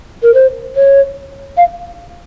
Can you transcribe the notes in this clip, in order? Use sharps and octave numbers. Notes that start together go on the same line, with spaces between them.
A#4
C5
C#5
F5